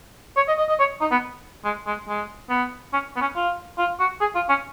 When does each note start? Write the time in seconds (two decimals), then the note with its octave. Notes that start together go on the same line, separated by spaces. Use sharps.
0.36 C#5
0.48 D#5
0.58 D#5
0.68 D#5
0.79 C#5
1.01 D#4
1.11 B3
1.64 G#3
1.86 G#3
2.08 G#3
2.50 B3
2.93 C#4
3.16 B3
3.21 C#4
3.36 F4
3.78 F4
4.00 F#4
4.21 G#4
4.35 F4
4.49 C#4